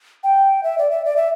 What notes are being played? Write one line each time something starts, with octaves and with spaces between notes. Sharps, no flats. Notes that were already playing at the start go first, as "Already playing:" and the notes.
G5
E5
D5
E5
D5
E5